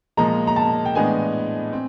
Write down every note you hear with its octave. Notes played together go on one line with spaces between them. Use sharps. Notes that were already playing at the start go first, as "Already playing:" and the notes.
A#2 F3 G#3 A#5
A#5
A5
G5
A2 E3 G#3 B3 D4 G#5
C4